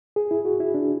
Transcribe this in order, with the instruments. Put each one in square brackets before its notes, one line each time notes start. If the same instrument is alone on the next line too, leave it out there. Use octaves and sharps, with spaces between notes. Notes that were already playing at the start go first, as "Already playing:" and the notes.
[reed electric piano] G#4
E4
F#4
E4
D4